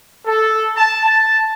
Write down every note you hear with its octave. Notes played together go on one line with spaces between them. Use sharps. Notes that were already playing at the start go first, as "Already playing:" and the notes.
A4
A5
A5